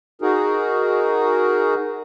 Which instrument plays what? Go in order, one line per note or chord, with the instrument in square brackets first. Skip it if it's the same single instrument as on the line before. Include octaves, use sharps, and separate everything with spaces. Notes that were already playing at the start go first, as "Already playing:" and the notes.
[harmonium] D#4 F#4 G#4 A#4